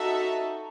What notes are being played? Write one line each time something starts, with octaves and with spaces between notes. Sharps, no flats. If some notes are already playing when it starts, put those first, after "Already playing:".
Already playing: D#4 F#4 A4 E5